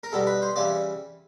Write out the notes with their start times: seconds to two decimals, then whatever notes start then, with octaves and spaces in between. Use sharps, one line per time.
0.03 A#4
0.12 B2 G3 A4
0.27 B4
0.42 C5
0.56 C#3 E3 G3 D5